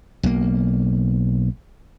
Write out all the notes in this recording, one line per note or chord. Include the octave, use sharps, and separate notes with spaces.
B1 A#3